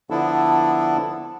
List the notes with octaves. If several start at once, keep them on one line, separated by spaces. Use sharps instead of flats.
D3 F3 B3 D4 E4 A4